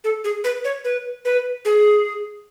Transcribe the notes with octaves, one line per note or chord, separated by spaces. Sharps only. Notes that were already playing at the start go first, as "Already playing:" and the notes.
A4
G#4
B4
C#5
B4
B4
G#4